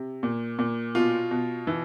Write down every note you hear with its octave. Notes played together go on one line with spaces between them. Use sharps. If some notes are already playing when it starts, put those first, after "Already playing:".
Already playing: C3
A#2
A#2
B2 F4
B2
E3